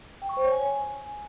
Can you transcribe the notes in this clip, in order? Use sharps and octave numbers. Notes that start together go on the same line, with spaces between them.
G5
C#6
C5
C#5
G#5